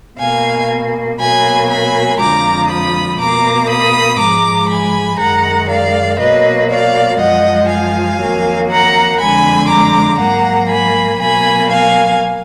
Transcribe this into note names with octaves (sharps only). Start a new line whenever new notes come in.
B2 A#3 F5 G#5
B2 F#3 A#3 G#5 B5
G#5 B5
F2 D3 F3 G#3 A#5 D6
B5 D#6
B2 A#3 A#5 D6
B5 D#6
G#2 F3 G#3 A#5 D6
G#5 B5
F#2 D#3 G#3 F#5 A#5
D5 F5
B2 F#3 A#3 B4 D#5
D5 F5
F#2 F3 G#3 D#5 F#5
F5 G#5
F2 D#3 F#3 A#3
F#5 A#5
F2 D3 G#3 G#5 B5
A#5 D6
G#2 F#3 A#3 F#5 A#5
G#5 B5
B2 F#3 A#3 G#5 B5
F5 G#5